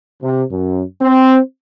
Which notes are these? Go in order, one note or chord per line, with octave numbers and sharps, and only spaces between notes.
C3
F#2
C4